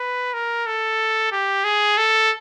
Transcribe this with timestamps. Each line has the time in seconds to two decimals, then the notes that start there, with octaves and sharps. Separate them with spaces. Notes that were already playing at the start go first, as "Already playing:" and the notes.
Already playing: B4
0.34 A#4
0.66 A4
1.32 G4
1.64 G#4
1.97 A4